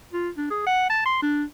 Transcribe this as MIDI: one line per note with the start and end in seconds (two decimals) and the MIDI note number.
0.13 0.30 65
0.38 0.46 62
0.51 0.62 68
0.67 0.85 78
0.90 1.05 81
1.06 1.19 84
1.23 1.44 62